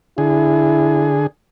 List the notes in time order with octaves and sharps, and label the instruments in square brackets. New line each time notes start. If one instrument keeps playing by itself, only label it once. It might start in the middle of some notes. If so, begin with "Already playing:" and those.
[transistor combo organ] D3 G#4 [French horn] E4